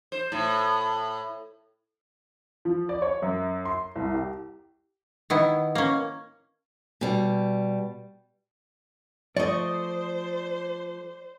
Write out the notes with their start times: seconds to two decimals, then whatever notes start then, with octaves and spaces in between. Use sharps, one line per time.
0.12 C5
0.32 A2
2.65 F3
2.89 D5
3.02 C#5
3.22 F#2
3.65 C6
3.96 C2
4.14 G4
5.30 D#3 B3 E4
5.75 A#3 C#4
7.01 B2 G3
9.37 F3 A3 C5 D5 D#5 C#6